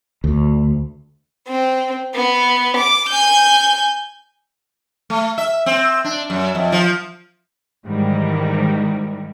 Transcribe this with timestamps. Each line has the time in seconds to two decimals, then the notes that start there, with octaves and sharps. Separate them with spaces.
0.24 D2
1.48 C4
2.15 B3
2.77 D6
3.09 G#5 G6
5.10 A3
5.38 E5
5.66 C4
6.04 D4
6.30 F#2
6.55 F2
6.72 F3
7.85 G#2 D#3 E3 G3